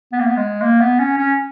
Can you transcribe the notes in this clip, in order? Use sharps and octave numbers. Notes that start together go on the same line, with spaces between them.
B3
A#3
B3
G#3
A#3
B3
C#4
C#4